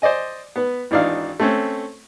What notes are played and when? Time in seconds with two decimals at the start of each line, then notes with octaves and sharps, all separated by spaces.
0.02 C5 D5 D#5 G#5
0.56 B3 B4
0.91 G#1 E3 D4 D#4 F5
1.40 A3 C4 C#4